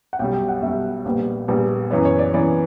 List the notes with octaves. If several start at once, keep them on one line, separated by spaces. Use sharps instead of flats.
F#5
B1 B2 G3 G5
G5
F#5
B1 B2 G3 E5
A#1 A#2 G3 B3
A#1 A#2 G3 B3
F#2 E3 B3 C#5
C#5
D5
F#2 E3 B3 D5